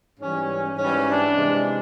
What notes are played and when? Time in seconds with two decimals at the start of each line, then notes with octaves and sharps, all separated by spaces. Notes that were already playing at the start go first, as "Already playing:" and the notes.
0.20 G#2 E3 G3 C#4
0.78 G#2 E3 G3 C#4
1.08 D4
1.37 C3 E3 G#3